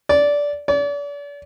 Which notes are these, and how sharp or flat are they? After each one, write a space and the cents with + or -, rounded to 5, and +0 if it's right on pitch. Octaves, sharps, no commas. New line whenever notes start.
D5 -15
D5 -40